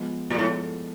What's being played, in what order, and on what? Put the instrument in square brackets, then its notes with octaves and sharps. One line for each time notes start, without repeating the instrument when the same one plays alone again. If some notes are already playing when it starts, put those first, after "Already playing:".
Already playing: [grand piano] F3 G#3 B3
[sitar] A#2 [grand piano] F3 G#3 B3
[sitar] A2